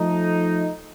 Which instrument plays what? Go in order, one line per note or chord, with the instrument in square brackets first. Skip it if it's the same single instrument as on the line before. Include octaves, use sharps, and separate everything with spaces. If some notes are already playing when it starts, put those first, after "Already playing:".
Already playing: [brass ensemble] F3 A3 D#4